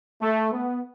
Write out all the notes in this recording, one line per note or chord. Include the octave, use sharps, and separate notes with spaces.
A3
B3